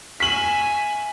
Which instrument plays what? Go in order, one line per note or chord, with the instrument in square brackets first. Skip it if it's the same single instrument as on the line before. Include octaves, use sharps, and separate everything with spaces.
[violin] E5 G#5 [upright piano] B6 F#7